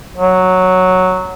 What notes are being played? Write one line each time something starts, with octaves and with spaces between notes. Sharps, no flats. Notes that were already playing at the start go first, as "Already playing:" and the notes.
F#3